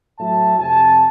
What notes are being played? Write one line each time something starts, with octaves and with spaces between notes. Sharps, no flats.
A2 F#3 E5 A5
F2 C3 G#5 A5